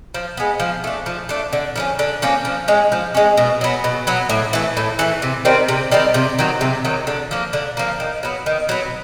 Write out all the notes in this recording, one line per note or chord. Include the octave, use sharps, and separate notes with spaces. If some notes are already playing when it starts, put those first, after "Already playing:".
F3
G#3 B3
F3
A3 D4
F3
A3 D4
D3
F3 A#3 C#4
D3
F3 A#3 C#4
F3
G#3 C#4
F3
G#3 C#4
B2
F#3 B3
B2
F#3 B3
A2
E3 A3
A2
E3 A3
C3
D#3 G3 C4
C3
D#3 G3 C4
C3
D#3 F#3
C3
D#3 F#3
D3
F3 A#3
D3
F3 A#3
D#3
F#3 B3
D#3
F#3 B3